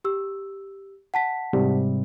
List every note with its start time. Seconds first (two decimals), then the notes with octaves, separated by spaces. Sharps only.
0.04 G4 E6
1.14 F#5 A5 B6
1.53 G#2 C3 G3